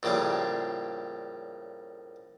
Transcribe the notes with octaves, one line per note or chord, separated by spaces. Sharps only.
A#1 A2 C#3 G3